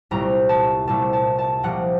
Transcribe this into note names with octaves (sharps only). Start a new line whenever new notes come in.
C2 A#2 A3 A#5
A5
C2 A#2 A3 A5
A5
A5
C2 A#2 F3 A#3 F#5